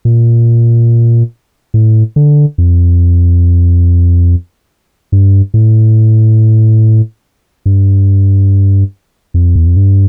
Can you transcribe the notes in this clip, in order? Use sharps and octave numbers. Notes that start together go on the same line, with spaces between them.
A#2
A2
D3
F2
G2
A2
G2
F2
E2
F2
G2